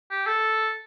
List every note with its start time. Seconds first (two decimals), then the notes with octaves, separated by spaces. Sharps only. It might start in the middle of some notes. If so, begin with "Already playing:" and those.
0.11 G4
0.26 A4